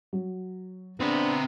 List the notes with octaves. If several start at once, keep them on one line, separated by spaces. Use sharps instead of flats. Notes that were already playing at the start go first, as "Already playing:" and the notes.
F#3
B3 C4 D4 A#5